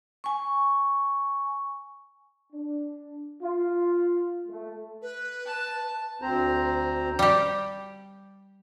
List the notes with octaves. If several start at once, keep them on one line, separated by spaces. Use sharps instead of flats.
G#5 C#6
D4
F4
A3
B4
A5
D2 C4 C5 A#5
G3 G4